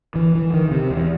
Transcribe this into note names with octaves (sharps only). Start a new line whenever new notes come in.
E3
E3
D#3
C3
E2